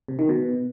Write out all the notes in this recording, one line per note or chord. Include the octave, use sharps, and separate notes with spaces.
C3
D#3
B2